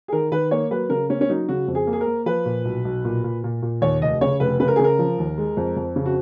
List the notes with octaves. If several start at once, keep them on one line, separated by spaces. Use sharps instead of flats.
G#4
D#3 A#4
D#3 B4
A#3 C#5
F#3 B4
C#3 A#4
A#3 C#4
C#4
F#3 D#4
C#3 F#4
F2
G#4
A#3
G#4
A#4
A#3
F3 B4
A#2
B1
B1
A#2
A#2
A#2
A#2
D#2 C#5
F1 D#5
C#3 C#5
F1 B4
C#3 B4
A#4
G#4
C#3 A#4
F3
D#2
G#3
F2
F2
C#3
F#4